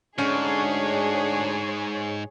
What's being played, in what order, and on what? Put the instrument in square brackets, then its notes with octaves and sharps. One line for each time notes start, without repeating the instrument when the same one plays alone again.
[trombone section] D2 D4 [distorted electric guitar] G#2 [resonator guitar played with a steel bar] C#4 [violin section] G#4 C#5